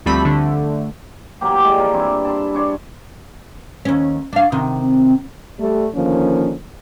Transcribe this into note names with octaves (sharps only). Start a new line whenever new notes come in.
D2 F3 G3 A3 C4 B5
D3 A3
E3 F#3 A#3 G4
G#3 D5
F3 A#4
G2 E3 C4 E4
A5 B5 C6
D4 C#5 C6
D#2 C#4
D4 F5
C3 D#3
G3 A3
D3 D#3 F3 A#3 C#4